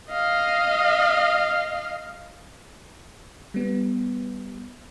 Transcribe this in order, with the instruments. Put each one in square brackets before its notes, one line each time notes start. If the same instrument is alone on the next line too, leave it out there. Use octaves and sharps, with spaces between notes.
[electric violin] D#5 F5
[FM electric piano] G3 B3